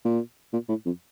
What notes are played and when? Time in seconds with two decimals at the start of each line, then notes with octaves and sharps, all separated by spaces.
0.05 A#2
0.53 A#2
0.69 A2
0.86 F2